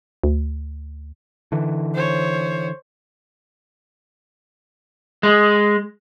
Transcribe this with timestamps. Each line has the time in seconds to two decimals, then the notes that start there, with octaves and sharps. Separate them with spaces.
0.24 D2
1.52 D3 E3
1.95 C5 C#5
5.23 G#3